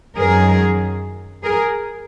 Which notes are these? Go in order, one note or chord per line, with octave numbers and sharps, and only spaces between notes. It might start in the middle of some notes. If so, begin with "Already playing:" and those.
F#2 D#3 F#3 G#4 A#4
G#4 A#4